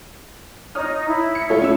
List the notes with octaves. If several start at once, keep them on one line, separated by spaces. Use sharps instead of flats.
D#4 C#5 D#6 F6
E4
C#7
F4 A4 C#5
C#4 E6